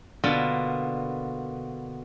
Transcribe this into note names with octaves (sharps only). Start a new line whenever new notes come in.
B2 D3 A#3 B3 F4